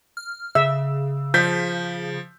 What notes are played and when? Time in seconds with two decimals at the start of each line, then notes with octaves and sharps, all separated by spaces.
0.17 F6
0.55 C#3 E5 E6
1.34 F3 G6 B6